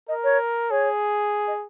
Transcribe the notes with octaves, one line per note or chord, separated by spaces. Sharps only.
A#4 D#5
C#5
G#4 C#5
D#5